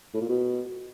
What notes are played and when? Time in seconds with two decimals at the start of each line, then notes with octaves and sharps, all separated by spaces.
0.14 A2
0.21 A#2
0.29 B2